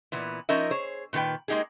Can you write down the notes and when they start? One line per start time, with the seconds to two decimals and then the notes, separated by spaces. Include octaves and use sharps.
0.12 A#2 E3 B3
0.49 F3 C#4 D#4 A#4 E5
0.71 G#4 C5 C#5
1.13 A#2 D#3 A3 B4 G5
1.48 G#3 A#3 D#4 G4 G#4